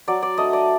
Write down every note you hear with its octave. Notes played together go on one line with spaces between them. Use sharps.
F#3 D5
D5
A3 D4 D#5
D5